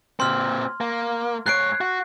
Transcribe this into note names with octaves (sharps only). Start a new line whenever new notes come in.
A#2 C4 C6 F6
A#3
G#2 C#5 F#6 C7 D7
F#4